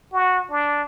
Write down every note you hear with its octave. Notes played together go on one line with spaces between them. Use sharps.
F#4
D4